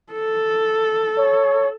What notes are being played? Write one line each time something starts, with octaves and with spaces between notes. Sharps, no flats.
A4
C#5